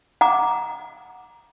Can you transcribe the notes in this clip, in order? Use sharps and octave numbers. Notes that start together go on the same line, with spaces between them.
F#5 A#5 D6